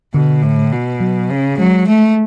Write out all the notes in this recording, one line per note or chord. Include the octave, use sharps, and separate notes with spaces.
B2 D3
A2
B2
F#3
C#3
F#3 G#3
A3